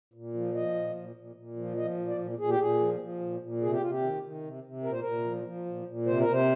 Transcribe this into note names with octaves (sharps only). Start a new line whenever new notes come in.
A#2
F3
F3 D#5
A#2
A#2
A#2
A#2
F3
F3 D#5
A#2
D5
A#2
A#2 G#4
G4
A#2 G#4
F3
F3
A#2
A#2
C3 G#4
G4
C3 F4
G4
D#3
D#3
C3
C3
A#2 A#4
C5
A#2 A#4
F3
F3
A#2
A#2
C3 C5
A#4
C3 C5